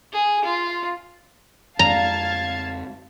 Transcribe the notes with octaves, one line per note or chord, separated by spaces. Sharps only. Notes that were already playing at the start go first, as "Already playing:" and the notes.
G#4
F4
F2 G#3 F5 A5 A#5 G#6